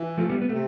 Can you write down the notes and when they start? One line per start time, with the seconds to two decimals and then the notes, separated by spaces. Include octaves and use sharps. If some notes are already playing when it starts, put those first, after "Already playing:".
Already playing: E3
0.18 F3 A3
0.29 G3 B3
0.42 B3
0.49 A3
0.53 C3